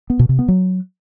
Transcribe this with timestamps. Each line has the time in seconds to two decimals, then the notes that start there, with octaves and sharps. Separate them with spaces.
0.10 B3
0.19 B2
0.29 C3
0.39 B3
0.48 F#3